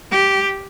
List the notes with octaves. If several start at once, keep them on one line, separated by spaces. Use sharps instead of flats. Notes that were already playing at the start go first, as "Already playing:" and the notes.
G4